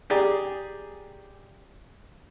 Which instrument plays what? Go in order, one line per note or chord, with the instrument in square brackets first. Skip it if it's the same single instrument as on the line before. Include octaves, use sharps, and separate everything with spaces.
[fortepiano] G4 G#4 D5 A#5